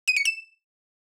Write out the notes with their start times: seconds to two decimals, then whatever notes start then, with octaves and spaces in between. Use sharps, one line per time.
0.08 D#7
0.16 C#7
0.25 E7